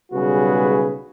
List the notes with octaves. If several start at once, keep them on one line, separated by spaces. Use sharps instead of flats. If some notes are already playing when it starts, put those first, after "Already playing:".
B1 C#3 G3 F#4 G#4 B4